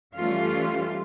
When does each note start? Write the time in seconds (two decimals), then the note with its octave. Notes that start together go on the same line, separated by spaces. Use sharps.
0.15 E3 G3 A3 C#4 F4